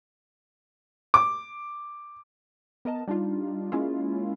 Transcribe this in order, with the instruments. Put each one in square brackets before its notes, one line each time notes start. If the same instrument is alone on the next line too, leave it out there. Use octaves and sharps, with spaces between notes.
[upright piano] D6
[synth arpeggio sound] B3 A#4 D#5 A5
G3 D4 D#4 F4
G#3 A#3 C#4 E4 F4